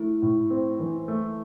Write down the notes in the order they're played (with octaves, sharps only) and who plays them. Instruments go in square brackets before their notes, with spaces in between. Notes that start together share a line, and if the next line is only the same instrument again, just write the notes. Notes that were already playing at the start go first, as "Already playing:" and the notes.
Already playing: [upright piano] A3 [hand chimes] E4
[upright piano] A2
C4
E3
A3